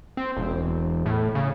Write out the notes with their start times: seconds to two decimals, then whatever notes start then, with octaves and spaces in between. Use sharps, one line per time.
0.17 C4
0.37 E1
1.06 A2
1.35 C#3